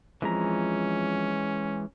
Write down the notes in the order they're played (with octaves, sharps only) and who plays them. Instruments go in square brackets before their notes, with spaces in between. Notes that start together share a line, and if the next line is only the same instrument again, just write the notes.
[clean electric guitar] F2 F3 [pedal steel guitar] E3 G#3 A#5 [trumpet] C#4